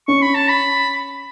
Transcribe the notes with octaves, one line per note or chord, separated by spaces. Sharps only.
C#4 C#6
B5
A5
B5